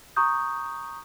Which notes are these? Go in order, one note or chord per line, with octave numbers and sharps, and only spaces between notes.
A#5 C#6 D#6 G6